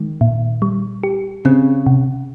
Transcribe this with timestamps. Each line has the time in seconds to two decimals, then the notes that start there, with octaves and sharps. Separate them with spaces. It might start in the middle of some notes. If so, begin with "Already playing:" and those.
Already playing: D#3 G#3
0.21 A#2
0.62 G3
1.03 G4
1.45 C#3 C4
1.86 C3